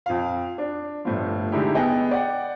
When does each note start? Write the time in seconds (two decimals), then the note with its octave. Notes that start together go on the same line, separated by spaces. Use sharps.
0.06 F2 F4 F5
0.58 D4
1.05 G1 A2 F3
1.52 D3 G#3 D#4 E4 G4
1.75 B3 G#4 D#5 G5
2.11 D5 F#5 G5